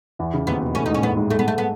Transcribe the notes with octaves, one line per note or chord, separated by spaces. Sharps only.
E2 E3
C#3
D#2 D#3 B3
B2 B3
A2 A3 C#4
G#2 G#3 D#4
C#4
A2 A3 B3
G#2 G#3
A3
B3
A3
B3